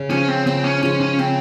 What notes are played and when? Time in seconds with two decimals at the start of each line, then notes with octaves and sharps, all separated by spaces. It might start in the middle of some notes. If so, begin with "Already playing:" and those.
Already playing: C#3
0.10 F3 G#3 C#4
0.28 C4
0.46 C#3 C4
0.64 C#4
0.83 F3 G#3 C#4
1.01 C#4
1.18 C#3 C4